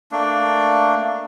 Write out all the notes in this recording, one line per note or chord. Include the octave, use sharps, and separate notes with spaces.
A3 A#3 D4